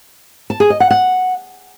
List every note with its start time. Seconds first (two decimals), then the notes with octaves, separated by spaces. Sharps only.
0.50 A5
0.60 G#4
0.70 D#5
0.80 F#5
0.91 F#5